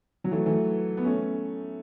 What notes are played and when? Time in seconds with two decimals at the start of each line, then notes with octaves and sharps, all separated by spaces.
0.24 F#3
0.31 E3 A3
0.46 E3 A3
0.97 B3
1.04 A3 C#4